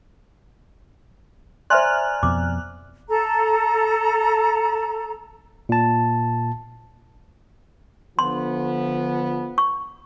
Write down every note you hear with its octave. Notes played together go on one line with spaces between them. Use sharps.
C5 D5 E5 G#5 A#5 C6 F6 F#6
F2 B2 D6
A4 A#5
A#2 A5
D3 F3 B3 C6
C#6